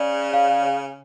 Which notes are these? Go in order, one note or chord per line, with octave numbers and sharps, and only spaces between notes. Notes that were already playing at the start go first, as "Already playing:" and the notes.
Already playing: C#3 D5
F5